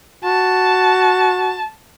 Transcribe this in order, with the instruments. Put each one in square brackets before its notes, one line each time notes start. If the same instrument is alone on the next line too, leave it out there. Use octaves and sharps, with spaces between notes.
[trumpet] F#4 [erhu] A5